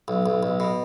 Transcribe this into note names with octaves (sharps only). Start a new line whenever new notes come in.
B1
B1
B1
B2